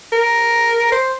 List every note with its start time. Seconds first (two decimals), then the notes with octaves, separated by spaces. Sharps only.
0.12 A#4
0.92 C5